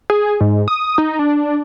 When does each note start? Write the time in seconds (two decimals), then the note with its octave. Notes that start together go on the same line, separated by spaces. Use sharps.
0.10 G#4
0.41 G#2
0.68 D#6
0.98 D#4
1.19 D4